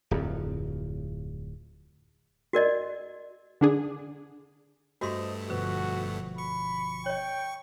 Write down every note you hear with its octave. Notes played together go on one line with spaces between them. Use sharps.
D1 F2
F#4 A#4 D5 D#5
D3 D4 G#4
G2 A3 F#4 G4 C5 D#5 C6 D#6
G1 B2 F3 F#4 B4
B5 C#6
C#5 D#5 G5